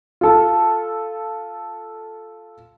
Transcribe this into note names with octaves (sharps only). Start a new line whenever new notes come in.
F4 A4